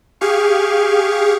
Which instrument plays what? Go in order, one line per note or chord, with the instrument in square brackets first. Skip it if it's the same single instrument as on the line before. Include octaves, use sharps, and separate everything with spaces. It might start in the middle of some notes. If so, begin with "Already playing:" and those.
[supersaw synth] G4 G#4 F5 C#6